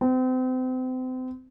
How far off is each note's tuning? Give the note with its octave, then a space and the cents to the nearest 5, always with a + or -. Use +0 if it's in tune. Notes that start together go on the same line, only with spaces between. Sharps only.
C4 -35